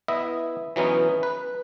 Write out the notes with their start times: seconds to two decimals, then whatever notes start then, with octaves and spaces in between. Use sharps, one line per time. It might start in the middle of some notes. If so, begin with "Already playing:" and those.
0.08 B3 E4 D#5 E5
0.76 E3 F#3 B3 C#4 D#4
1.23 B4